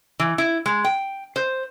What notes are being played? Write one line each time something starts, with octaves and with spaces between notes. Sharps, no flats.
E3
E4
G#3
G5
C5